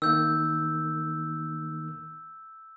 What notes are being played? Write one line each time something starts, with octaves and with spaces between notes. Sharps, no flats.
D#3 A#3 E6 G6